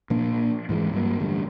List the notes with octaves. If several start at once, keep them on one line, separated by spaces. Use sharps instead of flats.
A#2 F3 A#3 D4
G#2 E3 G#3
G2 F#3 G#3 A#3
A1 D3 G3 A3